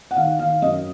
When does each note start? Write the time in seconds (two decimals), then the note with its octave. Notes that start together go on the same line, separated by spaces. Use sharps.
0.11 F#5
0.16 D#3 F5
0.39 D#3 F5
0.62 F#2 D#5